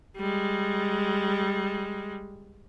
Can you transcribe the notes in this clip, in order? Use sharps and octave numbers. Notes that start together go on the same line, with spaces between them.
G3 G#3